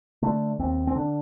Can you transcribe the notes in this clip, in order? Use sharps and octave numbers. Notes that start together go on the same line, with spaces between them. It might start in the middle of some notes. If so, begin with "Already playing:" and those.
D3 A3
D#2 C4
C4
D3 D4